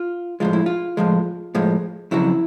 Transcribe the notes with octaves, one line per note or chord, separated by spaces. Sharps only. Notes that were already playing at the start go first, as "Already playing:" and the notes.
Already playing: F4
A2 F3 G#3 F4
E4
F4
A2 F3 G#3
A2 F3 G#3
F2 C#3 F#3 E4